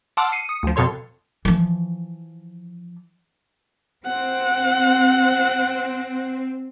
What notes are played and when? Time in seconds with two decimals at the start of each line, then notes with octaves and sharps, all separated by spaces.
0.17 F#5 A5 C6 D6 E6 F6
0.32 C7 C#7 D#7
0.49 D#6 C#7
0.63 D2 F3
0.76 F2 B2 A4 C#5 C6
1.45 E3 F3
4.06 C4 F#5